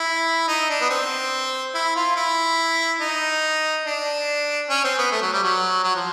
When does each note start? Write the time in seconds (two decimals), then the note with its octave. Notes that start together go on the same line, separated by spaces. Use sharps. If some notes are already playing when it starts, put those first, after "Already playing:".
Already playing: E4
0.48 D#4
0.70 D4
0.81 B3
0.90 C4
1.75 E4
1.96 F4
2.17 E4
3.01 D#4
3.86 D4
4.69 C#4
4.84 C4
4.98 B3
5.12 A3
5.22 F#3
5.33 G3
5.44 F#3
5.84 F#3
5.96 F3